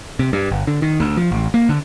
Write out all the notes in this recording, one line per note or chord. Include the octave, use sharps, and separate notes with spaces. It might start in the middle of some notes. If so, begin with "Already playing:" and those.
C3
G2
G1
D3
D#3
D2
F3
A1
A#3
D3